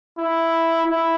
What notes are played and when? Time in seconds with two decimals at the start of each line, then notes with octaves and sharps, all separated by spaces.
0.18 E4
0.85 E4